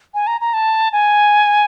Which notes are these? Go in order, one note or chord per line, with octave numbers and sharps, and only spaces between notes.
G#5
A#5
A#5
A5
G#5